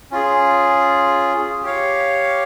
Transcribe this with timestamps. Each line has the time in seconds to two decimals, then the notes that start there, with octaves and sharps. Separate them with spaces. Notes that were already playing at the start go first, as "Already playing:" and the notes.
0.11 C#4 F4 G#4
1.63 G4 C#5 F5